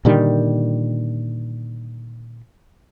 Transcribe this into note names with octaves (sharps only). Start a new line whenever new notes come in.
A#2 D3 D#3 G3